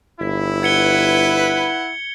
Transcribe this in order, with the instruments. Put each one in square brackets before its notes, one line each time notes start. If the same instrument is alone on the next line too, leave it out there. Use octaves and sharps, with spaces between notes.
[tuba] G1 [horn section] E4
[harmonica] B4 F#5 [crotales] G#6 C#7 G7